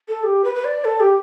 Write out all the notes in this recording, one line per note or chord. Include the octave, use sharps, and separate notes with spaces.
A4
G4
B4
B4
D5
A4
G4